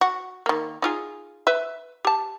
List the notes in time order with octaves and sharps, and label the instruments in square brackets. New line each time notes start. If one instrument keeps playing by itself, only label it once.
[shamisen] F#4
D#3 A#3
D#4 F4 G#4
B4 E5
G4 A5